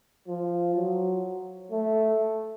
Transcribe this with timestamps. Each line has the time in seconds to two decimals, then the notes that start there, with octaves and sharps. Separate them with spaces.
0.28 F3
0.76 F#3
1.71 A3